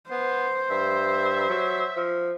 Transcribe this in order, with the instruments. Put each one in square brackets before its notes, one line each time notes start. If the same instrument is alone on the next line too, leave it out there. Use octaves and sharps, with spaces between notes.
[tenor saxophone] B3 [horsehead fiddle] C5
[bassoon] G2 [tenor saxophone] E5
[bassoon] F#3
F3